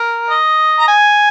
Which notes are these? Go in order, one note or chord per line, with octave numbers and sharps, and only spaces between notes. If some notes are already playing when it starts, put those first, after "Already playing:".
Already playing: A#4
D#5
A#5
G#5